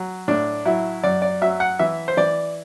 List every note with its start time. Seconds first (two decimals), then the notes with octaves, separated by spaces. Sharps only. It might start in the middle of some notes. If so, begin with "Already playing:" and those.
Already playing: F#3
0.28 A2 D4
0.65 F#3 E4
1.03 F#2 D5
1.22 D5
1.41 F#3 E5
1.60 F#5
1.79 E3 E5
2.08 C5
2.17 E3 D5